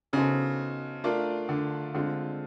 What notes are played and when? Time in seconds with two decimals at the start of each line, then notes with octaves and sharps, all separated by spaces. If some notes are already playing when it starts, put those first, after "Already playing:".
0.13 C#3 B3 D#4 F#4 A4 C5
1.04 A3 D4 F4 A#4 D5
1.49 D3
1.94 D3 G#3 C4 F4